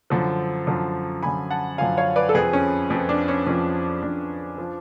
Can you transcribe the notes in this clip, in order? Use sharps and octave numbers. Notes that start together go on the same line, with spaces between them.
F#2 D3 F3
F#2 D3 F3
F#2 D3 F3 G#5 B5
F#5 A5
F#2 D3 F3 F5 G#5
C#5 F5
B4 D5
A4
F2 F3 G#4 B4
C#4
F2 F3
D4
C#4
F2 F3 C#4
F2 F3 D4
F3